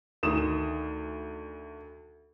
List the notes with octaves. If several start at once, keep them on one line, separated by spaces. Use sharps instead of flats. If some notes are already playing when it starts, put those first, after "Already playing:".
D2 D#3 D#6 E7